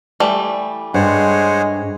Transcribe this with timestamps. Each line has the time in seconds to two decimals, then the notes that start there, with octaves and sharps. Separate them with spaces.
0.20 E3 G3 A3
0.94 G2 G#3 C5 C#5 F#5